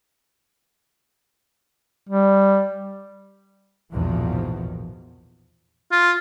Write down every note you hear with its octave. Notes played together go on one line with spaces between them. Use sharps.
G3
A#1 E2 G#2 B2 D#3 F3
F4